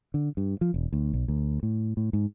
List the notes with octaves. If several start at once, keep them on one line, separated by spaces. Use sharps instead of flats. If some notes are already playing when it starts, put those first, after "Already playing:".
D3
G2
F3
E1
D2
B1
D2
A2
A2
G#2